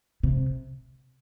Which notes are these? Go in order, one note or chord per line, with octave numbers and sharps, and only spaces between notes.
C3